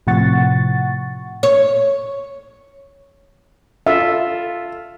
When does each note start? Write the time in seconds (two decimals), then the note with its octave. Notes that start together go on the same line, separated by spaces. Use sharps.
0.07 A2 C3 F3 F#5 C#6 A6
1.43 C#5
3.87 F4 A4 E5